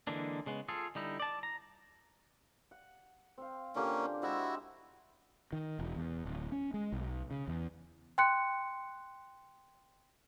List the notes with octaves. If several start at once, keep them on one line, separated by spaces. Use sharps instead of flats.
D3 E3 G#3 A#3 D4
C#3 G#3 B3
F4 G#4 A4
D3 G3 D#4 E4
D5 A5
A#5
F#5
C4 F5
D3 A#3 C#4 F4 G4
G#3 C4 E4 F#4 E5
D#3
E1
E2
D1
C#4
G#3
B1
C#3
E2
G5 C6 F#6 C#7